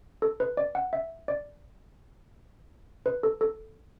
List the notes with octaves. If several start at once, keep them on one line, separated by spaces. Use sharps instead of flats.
A4
B4
D5
F#5
E5
D5
B4
A4
A4